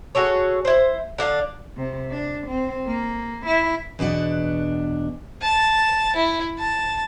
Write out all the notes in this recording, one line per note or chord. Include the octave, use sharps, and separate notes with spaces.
F#4 G#4 A4 C#5
E4 C5
D3 D4 F5
C3
D4
C4
A#3
E4
E2 B2 D4 F#5
A5
E4
A5